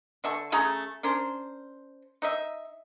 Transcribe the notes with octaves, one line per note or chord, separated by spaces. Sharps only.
D3 E5 A5 C#6
C#3 A3 G#4 A#5
C#4 D4 A#4 C5
D#4 D#5 E5